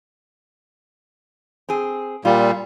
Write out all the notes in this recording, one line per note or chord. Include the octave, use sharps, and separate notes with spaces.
C4 G#4
A#2 G3 F4